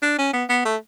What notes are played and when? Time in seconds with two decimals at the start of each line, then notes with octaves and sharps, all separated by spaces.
0.02 D4
0.18 C#4
0.33 B3
0.49 B3
0.65 A3